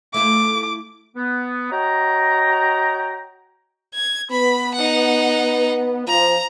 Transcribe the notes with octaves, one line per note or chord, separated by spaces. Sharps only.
A3 E4 F4 D6
B3
F#4 C#5 D#5 G5 A#5
G#6
B3 B5
D#4 F#5
F3 A#5